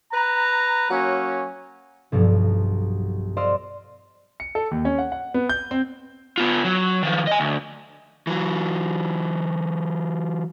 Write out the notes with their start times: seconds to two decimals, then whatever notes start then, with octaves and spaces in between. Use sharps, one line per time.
0.12 B4 A#5
0.89 F#3 A#3 C#4
2.12 B1 G2 F3 F#3
3.37 C5 D5 D#5 F5 C6 E6
4.40 C#7
4.55 A4
4.71 D#2
4.85 C#4
4.98 F#5
5.12 F#5
5.34 B3
5.49 G6
5.71 C4
6.38 B3 F4
6.65 F#3
7.03 D#3 F3
7.27 D#5 G#5
7.40 D2
8.27 E3 F#3